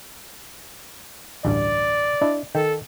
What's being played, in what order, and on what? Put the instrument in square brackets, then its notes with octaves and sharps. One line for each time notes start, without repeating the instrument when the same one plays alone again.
[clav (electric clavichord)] A1 D2 G2 [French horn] D5
[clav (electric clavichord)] D4 E4 D#5
[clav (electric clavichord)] D#3 G5 [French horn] A4